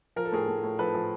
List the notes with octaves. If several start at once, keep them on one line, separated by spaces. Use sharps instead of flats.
F3 A#4
A4
A2 G#4 A#4
A2
A2
F3 A4 B4
F3